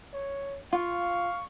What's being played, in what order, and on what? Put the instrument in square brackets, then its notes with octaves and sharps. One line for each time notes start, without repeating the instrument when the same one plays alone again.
[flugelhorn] C#5
[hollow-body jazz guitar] F4 [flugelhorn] F5 [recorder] C#6